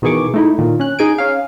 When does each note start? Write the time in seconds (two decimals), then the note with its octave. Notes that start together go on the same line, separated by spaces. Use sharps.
0.02 B2 D#3 E3 G#4 C#6 D6
0.34 A3 D#4 E4
0.58 A#2 D#3
0.80 C#4 F#6
0.99 D#4 G#4 G#5 D7
1.18 C#4 F5